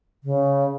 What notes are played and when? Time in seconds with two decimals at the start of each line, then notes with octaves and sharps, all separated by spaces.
0.24 C#3